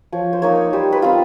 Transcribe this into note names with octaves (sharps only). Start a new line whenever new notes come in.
F3 C#5
C5
A#3 D#4 C#5
G3 C5
B4
C4 F4